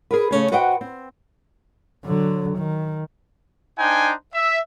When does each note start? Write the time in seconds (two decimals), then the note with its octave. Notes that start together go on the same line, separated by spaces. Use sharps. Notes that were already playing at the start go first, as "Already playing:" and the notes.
0.11 G#4 A#4 B4
0.31 C#3 A3 C#4 G#4
0.52 F#4 B4 C5 D#5 F#5 G5
0.81 C4
2.05 D3 F#3
2.58 D#3
3.79 D4 D#4 C5 G5 G#5
4.34 E5